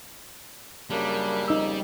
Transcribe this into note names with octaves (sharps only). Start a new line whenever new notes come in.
F#2 C#3 G3 A#3 D4
F2 C#3 D#4 E6